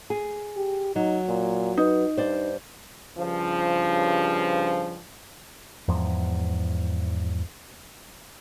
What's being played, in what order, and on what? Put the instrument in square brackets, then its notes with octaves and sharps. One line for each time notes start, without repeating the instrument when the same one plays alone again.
[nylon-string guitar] G#4
[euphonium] G4
[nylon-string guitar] F#3 [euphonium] D#4
[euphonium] A#2
[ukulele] D#4 [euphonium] B4
[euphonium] G2 [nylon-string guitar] C5 D5
[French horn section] G2 C#3 F3
[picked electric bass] E2 G#2 F3